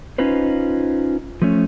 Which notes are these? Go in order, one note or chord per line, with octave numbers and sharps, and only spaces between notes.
C#4 D#4 F4 B4 C5
F3 A3 C#4